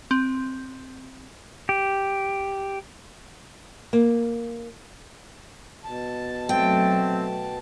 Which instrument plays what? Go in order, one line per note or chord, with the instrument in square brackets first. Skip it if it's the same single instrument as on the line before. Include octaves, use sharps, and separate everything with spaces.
[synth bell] C4
[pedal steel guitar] G4
[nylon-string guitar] A#3
[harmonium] B2 A5
[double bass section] F#3 A3 [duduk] C4 [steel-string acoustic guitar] G5